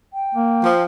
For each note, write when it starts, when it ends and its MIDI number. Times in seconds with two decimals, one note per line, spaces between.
0.13 0.84 79
0.35 0.70 58
0.63 0.85 53